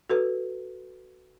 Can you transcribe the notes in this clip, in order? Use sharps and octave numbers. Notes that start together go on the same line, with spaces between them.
F#4 A4 B4